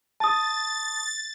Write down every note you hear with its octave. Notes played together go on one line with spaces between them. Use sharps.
A5 D#6 A6